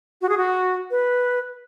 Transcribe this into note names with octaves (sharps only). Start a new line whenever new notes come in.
F#4
G#4
F#4
B4